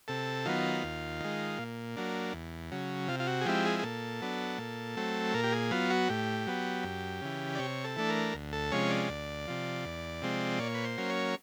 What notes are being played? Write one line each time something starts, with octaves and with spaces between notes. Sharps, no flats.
C3 A4
D#3 F#3 B3 F4
D#2
D#3 G#3
A#2
F#3 A#3 D4
E2
C#3 F#3
C3 F4
F4
F#4
G#4
F3 G#3 C4 E4 G4
G#4
G#4
A#2 A4
F#3 B3 D4
A#2
F#3 A3 C4
A#2 A#4
G4
G#4
F#3 B3 F4
F#4
A2 G4
F#3 B3
F#2
C#3 E3
D5
C3 C#5
A4
E3 A3 D4
A#4
D2
A4
C3 F3 G#3 C#4 C#5
D5
D2
C3 F3
E2
C3 F3 G#3 C4
A#2 C#5
B4
C5
F#3 A#3 C#4
C#5